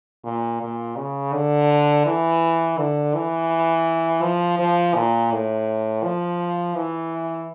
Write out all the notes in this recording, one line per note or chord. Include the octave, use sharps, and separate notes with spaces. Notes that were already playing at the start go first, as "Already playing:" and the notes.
A#2
A#2
C#3
D3
E3
D3
E3
F3
F3
A#2
A2
F3
E3